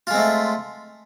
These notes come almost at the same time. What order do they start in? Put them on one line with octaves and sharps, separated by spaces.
F4 G#3 C4 A3